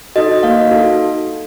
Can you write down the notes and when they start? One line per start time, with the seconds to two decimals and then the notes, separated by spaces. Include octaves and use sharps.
0.16 D#4 F#4 A4 D#5
0.43 A#3 F5
0.71 D#4 F#4 A4